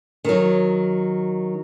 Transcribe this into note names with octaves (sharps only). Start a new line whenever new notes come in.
D#3 F#3